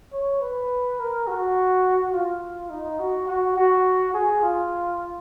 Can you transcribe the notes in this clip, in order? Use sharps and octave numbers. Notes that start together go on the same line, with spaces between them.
C#5
B4
A#4
F#4
F4
D#4
F#4
F#4
F#4
G#4
F4